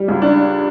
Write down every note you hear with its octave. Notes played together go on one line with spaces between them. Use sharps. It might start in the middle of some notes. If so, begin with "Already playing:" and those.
Already playing: G3
C#2
D4